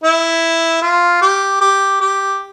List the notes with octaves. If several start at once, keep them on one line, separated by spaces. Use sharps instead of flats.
E4
F4
G4
G4
G4